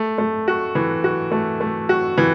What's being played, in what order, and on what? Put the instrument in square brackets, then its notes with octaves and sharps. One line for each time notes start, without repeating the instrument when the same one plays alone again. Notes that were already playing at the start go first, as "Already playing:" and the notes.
Already playing: [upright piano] A3
A3
F#4
E3
F#4
A3
A3
F#4
E3